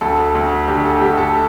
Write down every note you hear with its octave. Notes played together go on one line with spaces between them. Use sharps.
D2 A4
D2
D3 G4
A4
D2 G4
A4